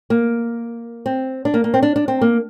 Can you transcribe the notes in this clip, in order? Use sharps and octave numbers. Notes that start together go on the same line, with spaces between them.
A#3
C4
D4
A#3
A#3
C4
D4
D4
C4
A#3